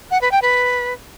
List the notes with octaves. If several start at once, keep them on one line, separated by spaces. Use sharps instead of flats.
F#5
B4
G5
B4